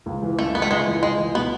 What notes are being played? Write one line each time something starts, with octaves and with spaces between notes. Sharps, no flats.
C#2
E3
C#3 A3
C#2 B3
A3
C#2 G#3
E3
C#2 G#3
E3
B2 B3